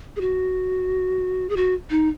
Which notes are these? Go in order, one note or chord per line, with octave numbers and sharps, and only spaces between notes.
G#4
F#4
G#4
F#4
D#4